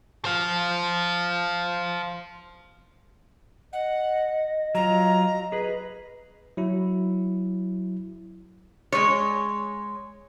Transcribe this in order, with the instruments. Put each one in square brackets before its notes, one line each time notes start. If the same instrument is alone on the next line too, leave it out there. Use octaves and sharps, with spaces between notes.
[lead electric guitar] C5 F5
[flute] D#5 [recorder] F#5
[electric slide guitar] F#3 F4 [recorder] A#5
[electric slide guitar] G#4 B4
[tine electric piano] F#3 E4
[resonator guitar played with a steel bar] G#3 C#5